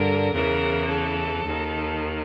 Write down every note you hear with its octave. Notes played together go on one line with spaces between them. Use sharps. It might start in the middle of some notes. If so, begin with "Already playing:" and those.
Already playing: G2 D3 A#4
E2 C#3 E3 A#4
A4
D#2 D#3